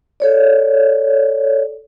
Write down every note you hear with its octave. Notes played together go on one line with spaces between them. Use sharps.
A4 C#5 D5